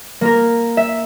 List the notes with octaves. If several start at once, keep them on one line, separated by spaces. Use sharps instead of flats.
A#3 A#4
E5